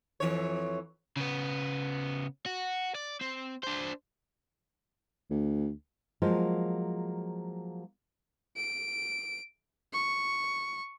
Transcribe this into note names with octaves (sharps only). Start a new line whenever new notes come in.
F2 E3 C#5
C#3 B3
F#4
D5
C4
D4 C5
D2
F3 F#3 G#3 A#3 F4
D7
C#6